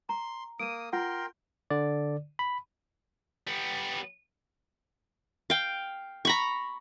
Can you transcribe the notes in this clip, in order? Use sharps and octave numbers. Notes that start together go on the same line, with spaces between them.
A#5 C6
A#3 D#6 D7 D#7
F4 A#4 F#5 G5 C6
D3 D5
B5
G3 B3
F5 G5
A#5 B5 C#6